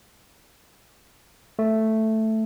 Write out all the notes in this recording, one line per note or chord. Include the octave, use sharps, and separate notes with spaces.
A3